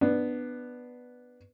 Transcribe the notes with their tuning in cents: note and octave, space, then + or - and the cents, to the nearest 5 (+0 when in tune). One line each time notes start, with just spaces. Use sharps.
B3 +0 D4 +20